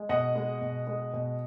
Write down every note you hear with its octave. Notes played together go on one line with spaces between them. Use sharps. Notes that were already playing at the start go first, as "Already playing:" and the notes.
Already playing: G#3
B2 D#5 F#5
G#3
B2
G#3
B2